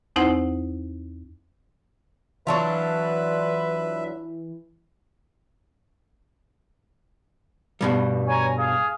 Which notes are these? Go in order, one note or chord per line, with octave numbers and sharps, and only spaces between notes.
E2 C4 D#4 E4 C5 F#5
E3 F#3 D4 F4 B4 E5
G2 B2 G3
C#5 G#5 A#5
G#4 F5